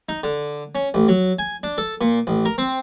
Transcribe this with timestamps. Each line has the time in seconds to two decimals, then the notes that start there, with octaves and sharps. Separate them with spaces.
0.09 D#4
0.23 D3
0.75 C#4
0.94 A1
1.08 F#3
1.39 G#5
1.63 D4
1.78 A4
2.01 A#2
2.27 A1
2.45 A#4
2.58 C4